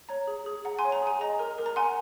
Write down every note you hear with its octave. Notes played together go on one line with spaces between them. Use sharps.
C#5 A#5
G#4
G#4
F#5 A#5
G#5 C6
C#5
A#5
G#4 G#5
D#5 A#5
A#4
A#4
A#5
F#5 G#5 C6